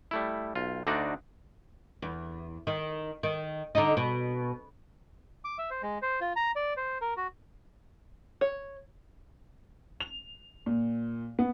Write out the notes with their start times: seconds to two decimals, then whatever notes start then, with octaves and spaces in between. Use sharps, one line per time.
0.11 G3 A3 E4
0.55 B1 F4
0.87 D2 D3 D4 D#4 F#4 D5
2.02 E2
2.67 D#3
3.23 D#3
3.75 D3 D#4
3.97 B2
5.45 D6
5.58 E5
5.71 C5
5.83 G#3
6.02 C5
6.21 F4
6.36 A#5
6.56 D5
6.77 C5
7.01 A#4
7.17 F#4
8.41 C#5
10.00 F7
10.66 A#2
11.39 B3